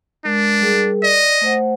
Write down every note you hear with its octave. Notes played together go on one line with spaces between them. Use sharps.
G#3 D4 A#4
G3 G#4 A#4
D5 D#5
A3 C5 F#5